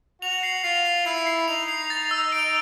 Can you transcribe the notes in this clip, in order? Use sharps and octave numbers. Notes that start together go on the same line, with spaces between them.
F#4 F7
C7
F4 C7
C7
E4 C7
C7
D#4 F7
C7
A6
E6
D7